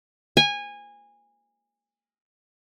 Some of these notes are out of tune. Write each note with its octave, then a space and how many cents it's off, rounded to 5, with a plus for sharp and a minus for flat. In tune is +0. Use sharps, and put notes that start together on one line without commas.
G#5 -20